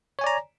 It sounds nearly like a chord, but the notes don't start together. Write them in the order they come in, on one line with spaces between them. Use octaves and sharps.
C#5 G#5 D5 A#5